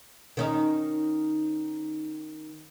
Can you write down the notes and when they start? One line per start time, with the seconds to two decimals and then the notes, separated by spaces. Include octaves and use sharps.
0.37 D#3 C#4 D#4